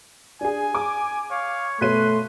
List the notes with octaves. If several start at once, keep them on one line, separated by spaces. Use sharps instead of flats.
D4 G#4 G#5
D6
C#5 F5
B2 A3 B4 C#5 C6 D#7